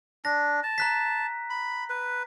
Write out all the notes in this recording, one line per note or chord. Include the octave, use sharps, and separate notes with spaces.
D4 A#6
A5
A#5 F#6 B6
B5
B4